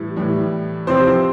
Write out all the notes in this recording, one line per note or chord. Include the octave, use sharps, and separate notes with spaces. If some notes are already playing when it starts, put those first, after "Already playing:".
Already playing: A2 E3 G3
A2 E3 G3
C3 F3 C4 C5